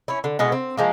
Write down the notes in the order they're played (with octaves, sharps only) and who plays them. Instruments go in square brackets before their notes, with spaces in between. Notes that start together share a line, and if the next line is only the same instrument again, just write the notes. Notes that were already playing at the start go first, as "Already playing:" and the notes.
[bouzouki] C#4 E4
D3
B2 G#3 B3 E4
C4
F3 G#3 A#3